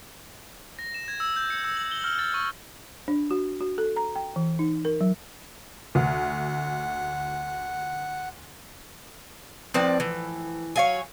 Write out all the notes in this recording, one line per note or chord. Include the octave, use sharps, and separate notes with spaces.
A#6
E7
G#6
E6
G6
C#7
E6
F#7
G7
F6
A6
C#6
D4
F#4
F#4
A4
A#5
G5
E3
D#4
A#4
F#3
D2 F#5
A2 F3 C4 B4 D5 F#5
E3
F#3 C#5 D#5 F5 G#5